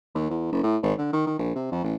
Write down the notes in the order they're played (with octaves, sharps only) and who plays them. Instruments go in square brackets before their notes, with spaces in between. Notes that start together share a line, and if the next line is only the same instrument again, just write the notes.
[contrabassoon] D#2
E2
F#1
A2
G#1
D3
D#3
D#3
A#1
C3
F2
A1